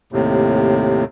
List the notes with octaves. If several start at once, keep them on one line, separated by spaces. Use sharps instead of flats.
D#2 A2 C3